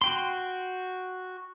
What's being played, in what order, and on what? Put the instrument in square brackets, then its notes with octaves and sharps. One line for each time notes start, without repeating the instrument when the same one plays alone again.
[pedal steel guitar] F#4 G5 C6